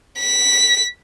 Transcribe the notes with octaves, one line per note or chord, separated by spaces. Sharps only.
B6